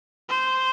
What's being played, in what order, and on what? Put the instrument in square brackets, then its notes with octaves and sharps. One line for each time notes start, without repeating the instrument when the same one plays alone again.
[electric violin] C5